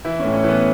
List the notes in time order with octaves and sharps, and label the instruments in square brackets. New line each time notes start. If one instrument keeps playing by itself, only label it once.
[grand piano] E3 E4
C#4
A2
C#4
E3 B3